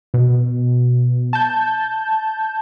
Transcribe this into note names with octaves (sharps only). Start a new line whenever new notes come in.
B2
A5 G6